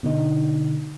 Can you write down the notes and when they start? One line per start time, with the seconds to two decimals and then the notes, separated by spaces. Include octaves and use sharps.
0.03 B2 D3 D#4